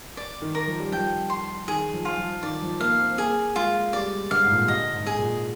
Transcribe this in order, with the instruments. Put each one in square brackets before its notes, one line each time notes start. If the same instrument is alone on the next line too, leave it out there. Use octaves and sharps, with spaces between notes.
[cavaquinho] D5
[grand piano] D#3
[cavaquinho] A#4
[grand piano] F3
G3
[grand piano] F3 [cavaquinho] G5
[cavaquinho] C6
[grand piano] D#3 [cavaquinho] G#4
[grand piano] F3
[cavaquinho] F4
[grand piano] F3
[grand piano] D#3 [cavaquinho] D5
[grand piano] F3
[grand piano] A#3 [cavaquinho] F5
[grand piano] C4
[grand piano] A#3 [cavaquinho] G#4
[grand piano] G#3 [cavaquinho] F4
[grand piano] G3 [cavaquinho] D5
[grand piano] D3 [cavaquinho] F5
[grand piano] G#2
A#2
C3
[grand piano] D3 [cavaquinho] D#5
[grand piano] G#2
[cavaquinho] G#4
[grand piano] A#2